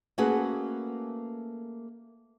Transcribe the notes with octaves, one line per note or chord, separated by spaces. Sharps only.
A3 A#3 C#4 F#4 G#4 B4